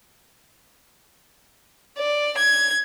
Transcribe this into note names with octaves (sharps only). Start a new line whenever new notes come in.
D5
G#6